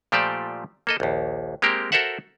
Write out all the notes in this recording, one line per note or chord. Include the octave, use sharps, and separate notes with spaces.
A#2 F3 A3 G4 C5 D5
A#3 A4 D#5
A#1 D#2
G#3 A#3 C4 G4 A#4
F#4 A4 A#4 C5 E5 F#5